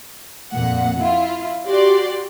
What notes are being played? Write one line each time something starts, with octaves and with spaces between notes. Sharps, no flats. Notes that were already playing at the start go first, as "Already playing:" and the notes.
F2 A#2 F#5
E4 F4
F#4 G4 D5 C6